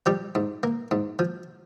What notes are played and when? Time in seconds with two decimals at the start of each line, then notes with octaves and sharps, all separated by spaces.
0.06 F3 G3 G4
0.35 G#2
0.63 A#3
0.91 G#2
1.19 F3